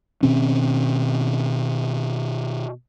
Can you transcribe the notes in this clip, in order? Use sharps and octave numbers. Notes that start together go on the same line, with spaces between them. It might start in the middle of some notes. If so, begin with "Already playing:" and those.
B2 D#3 C4 C#4